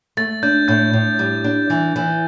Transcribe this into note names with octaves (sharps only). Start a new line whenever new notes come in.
A3 A6
D4 G6
A2 G6
A2
G3
D4
E3
E3